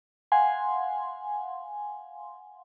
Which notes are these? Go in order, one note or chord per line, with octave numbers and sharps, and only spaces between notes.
F5 F#5 G#5 C6